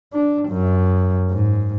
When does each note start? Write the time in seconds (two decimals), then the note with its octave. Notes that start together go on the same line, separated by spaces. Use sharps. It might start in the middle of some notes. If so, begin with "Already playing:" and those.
0.13 D4
0.49 F#2
1.30 G#2